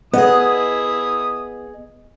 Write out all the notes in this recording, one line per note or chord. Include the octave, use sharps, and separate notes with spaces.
B3 E4 G#4 D#5 D#6